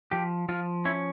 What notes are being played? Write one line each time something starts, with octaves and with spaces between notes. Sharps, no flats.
F3 G4
F3 F4
C#4 E4